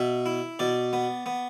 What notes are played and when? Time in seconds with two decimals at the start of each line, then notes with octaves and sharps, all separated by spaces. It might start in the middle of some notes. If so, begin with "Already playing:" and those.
Already playing: B2 E5
0.26 E4
0.59 B2 D5
0.93 B3
1.26 B3